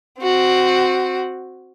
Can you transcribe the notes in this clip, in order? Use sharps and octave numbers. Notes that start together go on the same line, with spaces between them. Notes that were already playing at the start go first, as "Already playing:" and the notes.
C4 F#4